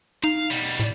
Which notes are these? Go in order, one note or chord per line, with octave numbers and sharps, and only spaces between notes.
D#4 F5
B2 G3
A2